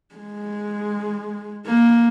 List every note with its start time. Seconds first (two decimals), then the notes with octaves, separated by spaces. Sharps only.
0.15 G#3
1.66 A#3